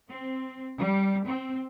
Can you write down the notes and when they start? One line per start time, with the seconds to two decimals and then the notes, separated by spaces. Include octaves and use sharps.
0.10 C4
0.79 G3
1.28 C4